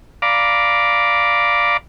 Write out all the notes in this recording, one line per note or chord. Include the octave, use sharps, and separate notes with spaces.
D5 F5 A#5 B5 D6